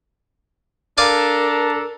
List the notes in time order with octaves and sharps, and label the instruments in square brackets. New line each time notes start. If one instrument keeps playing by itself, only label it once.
[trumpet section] D4 A4 A#5 [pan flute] A#4 [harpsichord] D5 F5 G#5